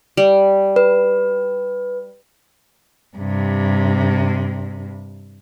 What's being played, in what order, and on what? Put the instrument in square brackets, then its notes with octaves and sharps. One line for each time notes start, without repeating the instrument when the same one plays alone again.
[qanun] G3
[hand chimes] B4
[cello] G2 C3